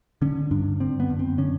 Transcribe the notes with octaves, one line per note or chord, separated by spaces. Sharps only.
D3 C#4
G2 D4
D3 C4
B3
F#2
C4
D3 C#4